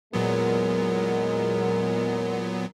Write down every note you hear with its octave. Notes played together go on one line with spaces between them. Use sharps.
E2 A#2 F#3 G#3 B3 A#4